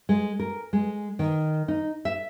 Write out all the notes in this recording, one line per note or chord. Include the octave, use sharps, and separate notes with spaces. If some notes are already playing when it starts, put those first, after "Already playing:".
G#3
A#4
G#3
D#3
D#4
E5